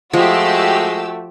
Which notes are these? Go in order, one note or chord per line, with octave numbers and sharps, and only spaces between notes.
F3 G#3 A3 F#4 G4 E6